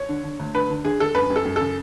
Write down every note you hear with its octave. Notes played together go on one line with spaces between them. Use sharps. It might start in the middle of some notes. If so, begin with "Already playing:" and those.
Already playing: C#5
D3
D3
D2
D3 B4
D3
D3 G#4
D3 A4
F#2 B4
F#2
A4
F#2
C#3 A4